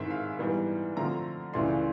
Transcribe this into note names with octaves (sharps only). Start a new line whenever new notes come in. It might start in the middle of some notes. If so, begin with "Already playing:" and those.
Already playing: G#2 D#3 G#3 C4 E4 E5
F5
G#2 E3 G3 B3
D3 F3 A3 C4 F4 A#5
C#2 C#3 E3 A3 D4 C6